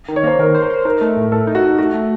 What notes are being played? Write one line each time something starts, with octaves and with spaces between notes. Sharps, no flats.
D#3
C#5
A#3 C5
D#3 A#4
C5
A#4
C5
D#4 A#4
A3
A2
A3 A4
D#4
F#4
D#4
A3 F#4
A3